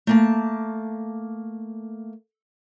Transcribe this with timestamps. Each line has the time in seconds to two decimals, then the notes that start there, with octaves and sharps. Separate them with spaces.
0.07 A3 A#3 A5